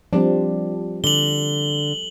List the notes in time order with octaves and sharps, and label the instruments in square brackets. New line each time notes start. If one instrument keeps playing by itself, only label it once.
[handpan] F3 G3 C4 [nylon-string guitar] D4
[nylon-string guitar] D3 [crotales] F#7 G7